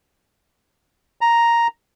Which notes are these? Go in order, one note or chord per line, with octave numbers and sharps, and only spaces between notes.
A#5